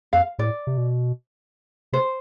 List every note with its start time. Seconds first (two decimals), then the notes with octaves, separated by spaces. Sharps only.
0.13 F2 F5
0.39 A2 D5
0.67 C3
0.78 B2
1.93 C3 C5